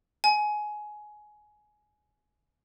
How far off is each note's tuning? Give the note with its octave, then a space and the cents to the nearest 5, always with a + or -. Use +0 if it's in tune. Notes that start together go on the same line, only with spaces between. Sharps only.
G#5 +20